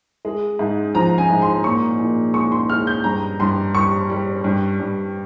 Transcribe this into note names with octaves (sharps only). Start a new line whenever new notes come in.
G#3
G#2
F3 A#5
G#5
G#2
C6
A#2 C#6
A#2
G#3 C#6
C6
G#3 F6
G6
G2 A#5
G2 C6
G3 C#6
G3
G2
G2